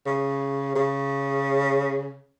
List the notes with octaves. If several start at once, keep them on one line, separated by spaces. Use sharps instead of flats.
C#3
C#3